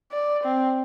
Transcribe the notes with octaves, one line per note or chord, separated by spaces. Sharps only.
D5
C4